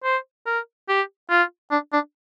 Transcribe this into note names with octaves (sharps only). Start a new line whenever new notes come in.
C5
A#4
G4
F4
D4
D4